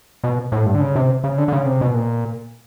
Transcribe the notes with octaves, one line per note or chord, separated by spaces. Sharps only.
B2
A2
G2
D3
C#3
C3
C#3
D3
D3
C#3
C3
B2
A#2